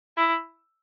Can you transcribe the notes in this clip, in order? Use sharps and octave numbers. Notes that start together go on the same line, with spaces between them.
E4